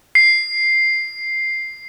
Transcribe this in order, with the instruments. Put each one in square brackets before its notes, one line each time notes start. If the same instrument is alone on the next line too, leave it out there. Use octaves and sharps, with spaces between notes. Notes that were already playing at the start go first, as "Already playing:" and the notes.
[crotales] C7